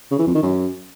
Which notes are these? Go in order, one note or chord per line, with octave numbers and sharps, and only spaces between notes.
C#3
E3
F2
D#3
F#2